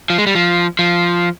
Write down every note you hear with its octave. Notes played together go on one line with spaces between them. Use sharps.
F3
G#3
G3
F3
F3